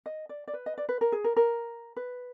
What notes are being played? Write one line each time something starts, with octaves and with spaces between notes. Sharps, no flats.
D#5
D5
D5
B4
D#5
D5
B4
A#4
G#4
A#4
A#4
B4